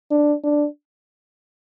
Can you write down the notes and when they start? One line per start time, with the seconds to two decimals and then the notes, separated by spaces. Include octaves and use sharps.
0.11 D4
0.43 D4